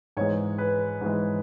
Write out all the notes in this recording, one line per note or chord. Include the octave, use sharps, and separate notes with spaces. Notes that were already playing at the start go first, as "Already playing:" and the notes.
G#2 E3 G#3 C#5
B4
G#2 E3 G#3